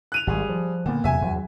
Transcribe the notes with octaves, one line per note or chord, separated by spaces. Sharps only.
F#6 D#7 F7
G#1 G3 G#4
F3
A#2 D3 B3
E2 C3 F#3 E5 G#5
E2 G2 F#3